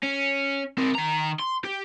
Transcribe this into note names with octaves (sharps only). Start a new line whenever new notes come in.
C#4
C4 A#4
D#3 A#5
C6
G4